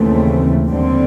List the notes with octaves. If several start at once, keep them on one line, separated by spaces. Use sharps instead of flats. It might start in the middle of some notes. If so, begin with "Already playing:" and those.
Already playing: D#2 C#3 E3 A3 C4
D#2 D3 G3 C4